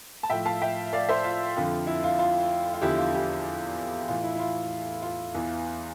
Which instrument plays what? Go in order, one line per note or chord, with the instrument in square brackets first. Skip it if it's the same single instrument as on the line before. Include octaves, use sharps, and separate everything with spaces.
[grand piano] A5
A2 F3 E5 G5
F5 A5
E5 G5
D5 F5
C5 E5
F4
F2 D3 F3
E4
F4
F4
F4
E2 D3 F3 E4 G4
F4
E4 G4
A2 E3 F4
E4
E4
F4
F4
E2 E3